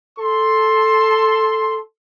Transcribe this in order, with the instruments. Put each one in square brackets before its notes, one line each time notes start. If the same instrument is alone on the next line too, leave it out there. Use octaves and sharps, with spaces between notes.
[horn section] A4 C6